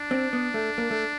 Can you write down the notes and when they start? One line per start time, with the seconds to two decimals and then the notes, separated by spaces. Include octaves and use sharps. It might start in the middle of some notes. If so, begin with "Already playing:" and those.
Already playing: D4
0.11 C4
0.33 B3
0.54 A3
0.78 A#3
0.91 A3